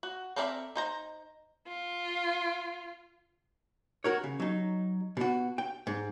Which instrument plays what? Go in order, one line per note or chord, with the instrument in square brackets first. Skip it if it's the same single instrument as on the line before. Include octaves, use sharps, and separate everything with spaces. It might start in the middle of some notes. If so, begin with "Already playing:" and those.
[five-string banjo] F#4
C4 A4 A#4 D5 E5
D#4 C5 A#5
[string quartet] F4
[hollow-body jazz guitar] F#4 A#4 C#5
C#3
F#3 D#4
B2 F#4
G5
G#2